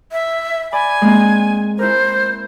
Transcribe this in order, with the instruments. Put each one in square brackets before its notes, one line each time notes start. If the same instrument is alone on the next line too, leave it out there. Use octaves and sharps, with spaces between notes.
[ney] E5
[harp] D5 B5 [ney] G#5
[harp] G#3 A#3 C4
[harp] E4 A#4 [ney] C5